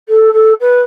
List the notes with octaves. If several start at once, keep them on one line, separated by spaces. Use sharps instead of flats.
A4
A4
B4